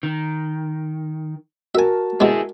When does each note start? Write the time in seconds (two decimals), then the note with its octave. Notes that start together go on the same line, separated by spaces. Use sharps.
0.03 D#3
1.75 F#4 A#4 E5 G#5 A5
2.20 B2 G#3 E4 G#4